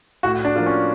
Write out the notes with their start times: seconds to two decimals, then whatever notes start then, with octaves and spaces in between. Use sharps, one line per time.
0.23 A2 F#4
0.45 D4
0.56 F3 A#3 D4 F4
0.66 C#4